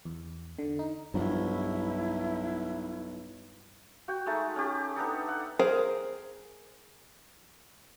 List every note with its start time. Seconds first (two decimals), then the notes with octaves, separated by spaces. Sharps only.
0.05 E2
0.59 D3
0.79 D#4
1.14 B1 G2 F3 E4
4.08 F#4 G5
4.26 G#3 A3 D#4 A5
4.56 C#4 G4
4.96 B3 D4 D#4 A4
5.28 F#5
5.59 G#4 A#4 C5 F5